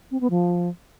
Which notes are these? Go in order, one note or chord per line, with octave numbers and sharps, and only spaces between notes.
C4
B3
F3